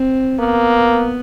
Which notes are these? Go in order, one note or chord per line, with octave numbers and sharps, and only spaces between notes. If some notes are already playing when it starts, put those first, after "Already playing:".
Already playing: C4
A#3 B3